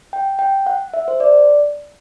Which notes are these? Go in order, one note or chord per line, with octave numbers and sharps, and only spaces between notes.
G5
G5
F#5
E5
C5
D5